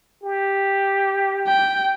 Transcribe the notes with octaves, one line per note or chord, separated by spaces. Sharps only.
G4
G5